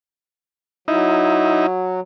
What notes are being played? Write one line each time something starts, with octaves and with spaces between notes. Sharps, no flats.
F#3 D#4 E4